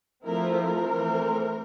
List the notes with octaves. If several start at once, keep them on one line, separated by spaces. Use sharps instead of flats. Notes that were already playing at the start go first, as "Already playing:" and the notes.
F3 A3 C4 E4 A#4
A#4
E3 A3 C4